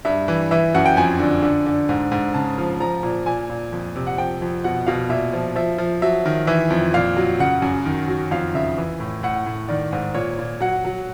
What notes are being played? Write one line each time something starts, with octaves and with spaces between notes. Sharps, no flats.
G2 E5
E3
E3 E5
F#2 F#5
G5
F2 G#5
D3
D3
D3
G#2
G#2
C#3 A5
F3
F3 A#5
A#2
A#2 G#5
A#2
F2
C3
F#5
F3 G5
F2
B2 F#5
B2 F5
A#2 E5
F3
F3 E5
F3
F#3 E5
D#3
E3 E5
F2
A#2 F5
F#3
C#3 F#5
F#2
D#3
F#3
F2 F5
C#3 E5
E3
A2
A2 F#5
A2
D#3 D5
G#2
A#2 C#5
A#2
F#3 F#5
F#3